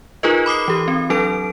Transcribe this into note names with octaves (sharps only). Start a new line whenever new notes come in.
D#4 F4 G#4 A#4 B4 D#5
B5 D6 D#6 C7
E3 G4
C4
F#3 D4 A4 D7